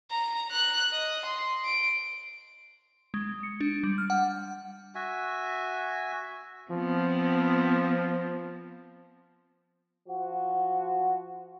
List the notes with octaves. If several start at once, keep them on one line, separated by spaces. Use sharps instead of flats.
A#5
F#6
D#5
C6
D7
G#3
C#7
D4
G3
F6
F#5
F#4 E5 G#5
F3 B3 C4
F3 F#4